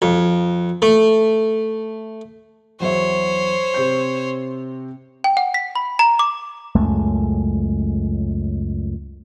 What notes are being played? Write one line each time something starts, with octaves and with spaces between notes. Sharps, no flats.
F2
A3
E2 F#3 C5 C#5 E5
C3 C4 G6
G5
F#5
B6
B5
A#5
D6
C#2 F#2 G#3 A3